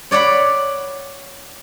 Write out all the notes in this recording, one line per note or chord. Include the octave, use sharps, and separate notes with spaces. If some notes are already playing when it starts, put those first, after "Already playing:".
C#5 D5 F#5 B5